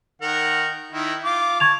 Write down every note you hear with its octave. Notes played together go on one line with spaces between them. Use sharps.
D#3 A#4 F#5
D#3 E4
F4 D6
A5 C#6 G#6 F7